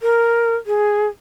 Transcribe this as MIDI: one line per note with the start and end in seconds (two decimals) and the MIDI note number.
0.02 0.57 70
0.66 1.07 68